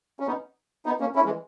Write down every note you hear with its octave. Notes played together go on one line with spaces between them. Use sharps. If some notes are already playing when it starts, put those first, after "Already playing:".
C#4
B3 D#4
B3 D#4
A#3 C#4
C#4 E4
E3 G#3